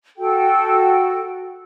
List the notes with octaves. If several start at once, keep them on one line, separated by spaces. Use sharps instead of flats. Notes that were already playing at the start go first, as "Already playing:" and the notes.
F#4 A4 G5